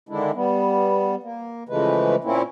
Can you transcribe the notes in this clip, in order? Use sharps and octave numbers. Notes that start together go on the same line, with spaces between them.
D3 D#3 G#3 D4 E4
G3 B3
A#3
C#3 E3 F3 G#3 A3 B4
A#2 A#3 C4 C#4 E4